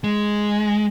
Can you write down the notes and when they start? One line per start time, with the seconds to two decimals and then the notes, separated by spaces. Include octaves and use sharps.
0.04 G#3